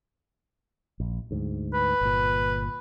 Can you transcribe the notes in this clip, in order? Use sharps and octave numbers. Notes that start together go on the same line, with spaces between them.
A#1
D2 G#2
B4
G1 A#2